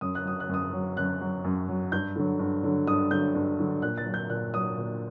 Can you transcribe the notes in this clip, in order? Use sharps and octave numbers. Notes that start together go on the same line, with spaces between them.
F#2 D#6
F#6
F#3 D#6
F#6
F#2 D#6
F#3
F#2 F#6
F#3
F#2
F#3
G2 G6
D3 F#3
G2
D3 F#3
G2 D#6
D3 F#3 G6
G2
D3 F#3
A#2 F#6
A6
F#3
G6
A#2 F#6
F#3 D#6
A#2